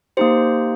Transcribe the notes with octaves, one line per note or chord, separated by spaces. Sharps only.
A#3 D#4 G4 C5